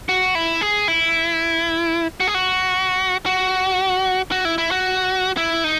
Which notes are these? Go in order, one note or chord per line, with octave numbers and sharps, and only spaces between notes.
F#4
E4
G#4
E4
F#4
G#4
F#4
F#4
F#4
E4
E4
F#4
E4
D#4